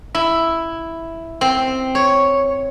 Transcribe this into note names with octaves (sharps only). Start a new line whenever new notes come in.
E4
C4
C#5